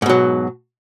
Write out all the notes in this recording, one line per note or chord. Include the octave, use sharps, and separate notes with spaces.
G#2 B2 F#3